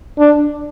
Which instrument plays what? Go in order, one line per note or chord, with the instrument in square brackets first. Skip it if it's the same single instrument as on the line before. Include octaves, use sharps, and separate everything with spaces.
[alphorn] D4